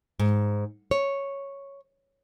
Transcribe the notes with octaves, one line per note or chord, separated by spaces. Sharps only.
G#2
C#5